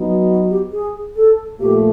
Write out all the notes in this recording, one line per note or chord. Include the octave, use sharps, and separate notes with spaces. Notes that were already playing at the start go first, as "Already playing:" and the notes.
Already playing: F#3 B3 D#4
F#4
G4
G#4
A4
A#2 F3 A3 G4